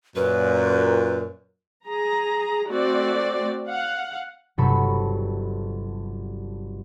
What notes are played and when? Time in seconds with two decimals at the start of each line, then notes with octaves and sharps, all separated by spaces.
0.16 F#2 A#2 B4
1.87 G#4 A#5
2.71 A3 C4 F#4 D5
3.68 F5 F#5
4.58 G1 C3 F#3 A4 B5 C#6